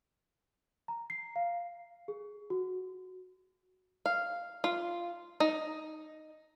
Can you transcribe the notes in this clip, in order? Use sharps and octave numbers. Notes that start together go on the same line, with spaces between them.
A#5
C7
F5
G#4
F#4
F5
F4
D#4